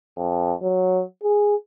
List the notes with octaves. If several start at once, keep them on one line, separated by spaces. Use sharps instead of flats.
F2
F#3
G#4